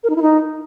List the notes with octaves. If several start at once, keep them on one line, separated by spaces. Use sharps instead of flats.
A#4
D#4
E4
D#4